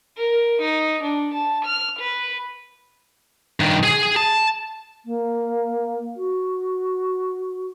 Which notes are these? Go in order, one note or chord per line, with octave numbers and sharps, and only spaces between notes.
A#4
D#4
D4
A5
F6
B4
G2 D#3
G#4 G#5
A5
A#3
F#4